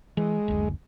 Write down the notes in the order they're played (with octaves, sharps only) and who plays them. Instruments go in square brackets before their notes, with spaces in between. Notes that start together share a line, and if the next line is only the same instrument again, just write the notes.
[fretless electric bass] E3 [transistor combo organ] G#3
[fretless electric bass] F#1 D2